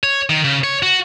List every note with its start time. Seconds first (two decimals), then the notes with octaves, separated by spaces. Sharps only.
0.03 C#5
0.29 D#3
0.44 C#3
0.64 C#5
0.83 F#4